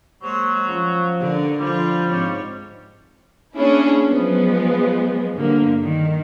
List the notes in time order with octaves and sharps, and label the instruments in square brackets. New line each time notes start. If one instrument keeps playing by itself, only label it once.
[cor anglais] F#3 [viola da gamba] G#3 A#3 C5
[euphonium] F3 [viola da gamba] C#4
[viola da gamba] D3 D4 A#4
[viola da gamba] D3 F4 [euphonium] F3 [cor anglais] G3
[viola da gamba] G#2 C4 C#5
[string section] A#3 C#4 D4 E4 G#4
F3 F#3 G#3 B3
G2 D3 A#3
D#3